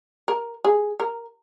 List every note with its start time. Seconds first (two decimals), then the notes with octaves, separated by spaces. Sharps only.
0.28 A#4
0.64 G#4
1.00 A#4